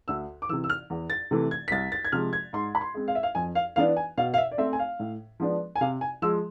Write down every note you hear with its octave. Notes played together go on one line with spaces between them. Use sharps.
D2 E6
D6
C3 E3 E6
E6
F6
E2
A6
C3 E3 A3
G#6
B6
C2 A6
A6
G#6
C3 F3 G#3 F6
G#6
G#2 C6
B5
C6
G#3 C4
F5
E5
F5
F2 G#5
F5
E3 B3 D4 F5
G#5
B2 F5
F5
E5
D5
A3 C4 E5
G#5
F5
A2
F3 G#3 B3 D4
G#5
C3 F5
G#5
F3 G#3 E6